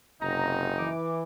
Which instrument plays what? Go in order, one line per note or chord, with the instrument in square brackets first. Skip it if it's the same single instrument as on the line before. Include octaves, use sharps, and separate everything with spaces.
[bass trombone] F#1 [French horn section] C3 [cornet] D#4 [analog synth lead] A#5
[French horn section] E3 [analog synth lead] D6